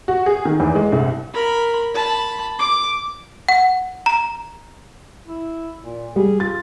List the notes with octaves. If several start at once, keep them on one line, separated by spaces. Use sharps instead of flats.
F#4
G#4
D#3
E2
G#3
C2
A#4 B5
A5 B5
D6
F#5
A#5
E4
A#2
G3 G#4
F4 A6